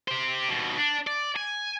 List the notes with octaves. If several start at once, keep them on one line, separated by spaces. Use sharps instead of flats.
G4 C5
D#2 B2
D4
D5
G#5